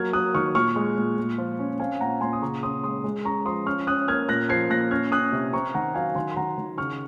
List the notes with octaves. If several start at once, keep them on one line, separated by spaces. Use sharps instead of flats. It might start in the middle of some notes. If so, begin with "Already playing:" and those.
Already playing: F#3 A#3 F6 G#6
A#3 D#6 F#6
D#3 C#6 F6
A#2 C#6 F6
G#3
A#2
A#2
F3
C#4
C4 F5 G#5
A#2 F#5 A#5
A#2 G#5 C6
D#6
C#3 A#5 C#6
C#4 C6 D#6
G#3 C6 D#6
G#3
C#4 A#5 C#6
F3 C6 D#6
C#4 C#6 F6
C#4 D#6 F#6
A#3 F6 G#6
A#2 F#6 A#6
F3 G#6 C7
A#2 F#6 A#6
C#4 F6 G#6
C#4 D#6 F#6
C3
C4 A#5 C#6
D#3 F#5 A#5
F#3 F5 G#5
D#3 G#5 C6
C6
D#3 F#5 A#5
D#3
C#3 C#6 F6